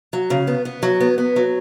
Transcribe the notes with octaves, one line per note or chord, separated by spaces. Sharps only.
F#3
C#3
B3
B3
F#3
B3
B3
F#3